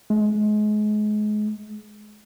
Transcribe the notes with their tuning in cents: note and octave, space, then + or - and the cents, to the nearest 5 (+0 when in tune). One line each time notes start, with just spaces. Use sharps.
G#3 +30